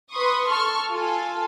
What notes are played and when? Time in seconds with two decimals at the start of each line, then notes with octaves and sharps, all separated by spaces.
0.12 B4 C6 C#6 D#6
0.49 A4 C#6 F6
0.89 F4 A4 G#5